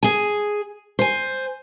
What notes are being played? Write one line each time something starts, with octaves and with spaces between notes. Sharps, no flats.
G#4 G#5
C5 G#5